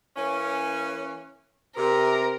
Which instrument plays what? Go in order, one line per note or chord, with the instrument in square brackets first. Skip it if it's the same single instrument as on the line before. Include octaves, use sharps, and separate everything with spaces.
[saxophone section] E3 A#3 C#4
[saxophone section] C3 [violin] A#4